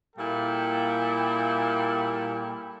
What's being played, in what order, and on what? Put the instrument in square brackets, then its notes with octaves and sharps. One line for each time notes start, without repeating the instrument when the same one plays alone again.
[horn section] A#2 G3 A#3 E4 A4 G5